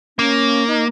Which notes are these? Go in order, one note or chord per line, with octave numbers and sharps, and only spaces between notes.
A#3 C#4
D#4